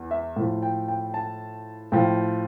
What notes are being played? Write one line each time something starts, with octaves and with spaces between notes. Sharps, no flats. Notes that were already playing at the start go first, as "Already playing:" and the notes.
Already playing: E2
E5
A2 F3
G5
G5
A5
A2 F3 G5